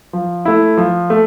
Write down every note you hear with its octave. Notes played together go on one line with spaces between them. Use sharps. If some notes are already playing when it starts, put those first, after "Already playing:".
F3
A3 E4
F3
A3